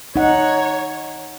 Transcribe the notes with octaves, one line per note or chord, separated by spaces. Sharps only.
D#4 C#5 F#5